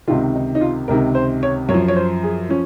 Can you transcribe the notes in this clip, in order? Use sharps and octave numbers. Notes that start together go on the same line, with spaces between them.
C#2 C3 D#3 F4
D#4
D#4
F4
C#2 C3 D#3 A#4
C5
C#5
F#2 C#5
F3
C#5
C5
G#4
F3 C#4